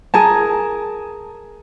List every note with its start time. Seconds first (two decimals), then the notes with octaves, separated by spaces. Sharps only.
0.14 G#4 A#4 A5